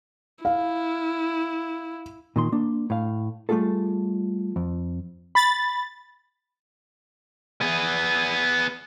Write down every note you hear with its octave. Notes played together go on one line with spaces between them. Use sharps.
E4 F5
A#2 D#3 C6
A#3 D4
A2 F5
G3 A3 B3 F4 G#4 A4
F2
B5 A6
B3 G#4